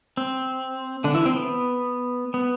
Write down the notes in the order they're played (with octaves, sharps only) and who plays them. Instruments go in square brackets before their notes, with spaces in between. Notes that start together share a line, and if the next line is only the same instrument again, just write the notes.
[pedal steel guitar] C4
D3 D4
E3 E4
C4
B3
B3